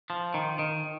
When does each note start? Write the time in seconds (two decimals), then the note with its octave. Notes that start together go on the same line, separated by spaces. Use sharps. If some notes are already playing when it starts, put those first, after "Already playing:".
0.10 F3
0.34 D#3
0.59 D#3